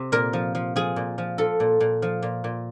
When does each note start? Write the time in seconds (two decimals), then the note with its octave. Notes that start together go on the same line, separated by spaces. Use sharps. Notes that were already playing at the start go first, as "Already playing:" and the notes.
Already playing: C3
0.12 A#2 A#4
0.33 F3
0.55 F3
0.76 F3 G#4
0.96 A#2
1.18 F3
1.38 F3 A4
1.60 A#2
1.80 A#2
2.02 F3
2.22 A#2
2.44 A#2